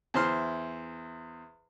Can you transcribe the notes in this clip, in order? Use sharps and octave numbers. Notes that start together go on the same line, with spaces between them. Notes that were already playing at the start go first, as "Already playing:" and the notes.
E2 E4 C5 C6 F6